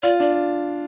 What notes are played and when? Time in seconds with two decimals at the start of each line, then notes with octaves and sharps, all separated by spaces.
0.03 F4 D5
0.20 D4 D5